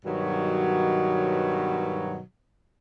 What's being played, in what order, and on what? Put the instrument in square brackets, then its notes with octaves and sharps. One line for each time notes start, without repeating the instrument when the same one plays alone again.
[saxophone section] G2 B2 D#3 F#3